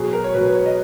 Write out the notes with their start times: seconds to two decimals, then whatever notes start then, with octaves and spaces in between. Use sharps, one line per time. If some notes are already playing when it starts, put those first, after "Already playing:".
Already playing: B2 F#3 G#4
0.13 A#4
0.24 C#5
0.34 B2 F#3 B4
0.44 B4
0.55 C#5
0.66 D#5